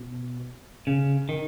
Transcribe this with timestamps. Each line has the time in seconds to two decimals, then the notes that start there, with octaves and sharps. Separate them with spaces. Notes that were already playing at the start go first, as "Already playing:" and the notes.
Already playing: B2
0.87 C#3
1.29 D#3